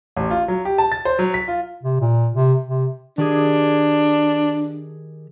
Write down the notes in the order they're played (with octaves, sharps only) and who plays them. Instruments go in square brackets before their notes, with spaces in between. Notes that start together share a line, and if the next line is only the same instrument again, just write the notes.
[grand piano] A1
F4
F#3
G4
A5
A6
C5
F#3
B6
F4
[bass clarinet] C3
A#2
C3
C3
[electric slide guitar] D#3 G4 G#4 [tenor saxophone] D4